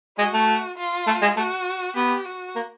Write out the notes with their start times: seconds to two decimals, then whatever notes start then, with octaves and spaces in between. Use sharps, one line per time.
0.18 G#3 F#4
0.33 A3
0.78 F4
1.07 A3
1.22 G#3
1.37 A3 F#4
1.96 B3 G4
2.25 F#4
2.56 A#3